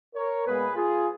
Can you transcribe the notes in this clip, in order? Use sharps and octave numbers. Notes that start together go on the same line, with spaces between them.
A#4 C#5
A#2 G#3 B3 G#4 B4
F4 G#4